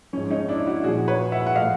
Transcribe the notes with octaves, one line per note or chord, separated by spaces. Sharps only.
G#2 F3 C#4
C#4 D#4
D4 E4
E4 F#4
A#2 F3 F#4 G#4
B4 C#5
E5 F#5
F#5
A2 F3 D#5 F5